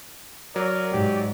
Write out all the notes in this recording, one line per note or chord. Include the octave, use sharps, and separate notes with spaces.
F#3 A#4 D5
G#2 G4